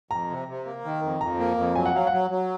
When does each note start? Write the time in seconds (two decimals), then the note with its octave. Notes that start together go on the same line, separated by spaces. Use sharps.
0.11 F2 A#5
0.30 C3
0.48 C3
0.65 A#3
0.85 D#3
1.03 F2
1.20 F2 A#5
1.39 A#3
1.57 F2
1.75 F#3 G#5
1.86 F#5
1.93 F#3 F5
2.07 F#3 F#5
2.30 F#3